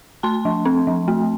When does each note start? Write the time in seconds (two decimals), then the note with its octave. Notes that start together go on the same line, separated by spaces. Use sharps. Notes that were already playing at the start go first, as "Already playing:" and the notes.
0.23 A3 A5 C6
0.45 F3
0.65 C4
0.87 F3
1.08 A3